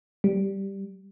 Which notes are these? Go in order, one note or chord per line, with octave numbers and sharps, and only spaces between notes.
G3